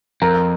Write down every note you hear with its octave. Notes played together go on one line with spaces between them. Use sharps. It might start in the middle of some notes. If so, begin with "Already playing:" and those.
F2 A#4 A#5